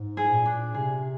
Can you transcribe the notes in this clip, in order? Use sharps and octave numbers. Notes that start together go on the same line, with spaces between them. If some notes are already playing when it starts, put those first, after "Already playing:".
Already playing: G#2
G#4
A#2
D4
C3 G#4